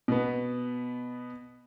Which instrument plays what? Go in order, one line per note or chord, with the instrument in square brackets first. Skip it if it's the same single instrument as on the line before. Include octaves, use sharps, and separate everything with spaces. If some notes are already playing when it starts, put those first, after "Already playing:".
[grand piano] B2 B3